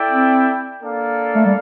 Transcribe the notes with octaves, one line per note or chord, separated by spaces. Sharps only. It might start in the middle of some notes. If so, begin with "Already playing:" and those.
Already playing: E4 A4 D5 G5
C4
A#3 D4 A4 D5 F5
A3
G3